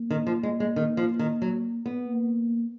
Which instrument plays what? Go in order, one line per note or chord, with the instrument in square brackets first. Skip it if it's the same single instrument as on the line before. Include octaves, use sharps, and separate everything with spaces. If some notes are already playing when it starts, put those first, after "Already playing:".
Already playing: [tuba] A#3
[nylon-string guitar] D#3
F3
G#3
G#3
D#3
F3
D#3
F#3
B3
[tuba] A#3